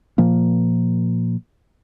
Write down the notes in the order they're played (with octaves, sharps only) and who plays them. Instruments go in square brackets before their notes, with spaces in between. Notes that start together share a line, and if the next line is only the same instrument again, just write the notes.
[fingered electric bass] A#2 F3 A#3